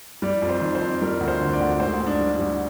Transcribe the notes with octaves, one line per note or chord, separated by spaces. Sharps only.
G3 D5
F2
C5
D#3
C5
F2
G3 A#4
D2
C5
D3
D5
D2
G#2 C5
G#2
D4
G3
D4
G3